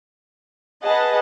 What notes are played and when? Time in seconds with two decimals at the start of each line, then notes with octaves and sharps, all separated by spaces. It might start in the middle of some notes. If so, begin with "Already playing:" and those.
0.85 G#4 B4 D#5 F#5 A5